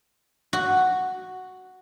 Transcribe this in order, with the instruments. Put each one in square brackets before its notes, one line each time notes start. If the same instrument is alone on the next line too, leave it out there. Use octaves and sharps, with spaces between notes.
[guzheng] F#4